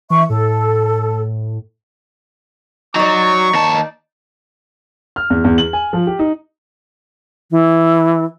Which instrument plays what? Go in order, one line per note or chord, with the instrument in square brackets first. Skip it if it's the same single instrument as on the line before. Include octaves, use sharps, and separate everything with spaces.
[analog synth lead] E3 [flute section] E5 C#6
[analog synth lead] A2 [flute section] A4
[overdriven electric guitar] F#3 [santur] D#4 D5 [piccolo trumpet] C#6
[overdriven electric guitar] D#2 A5
[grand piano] F6
E2
E2
F#7
G#5
F3
G4
D#4
[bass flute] E3